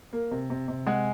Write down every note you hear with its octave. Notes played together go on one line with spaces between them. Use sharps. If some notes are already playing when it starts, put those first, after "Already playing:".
A#3
C3
C3
C3
G#3 F#5 G#5